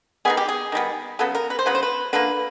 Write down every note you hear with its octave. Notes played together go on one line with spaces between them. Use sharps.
D#3 G3 B3 G#4
G4
G#4
D#3 G3 B3
C#3 F#3 B3 A4
A#4
B4
C5
C#3 F#3 B3 B4
C5
B4
D3 F3 A#3 B4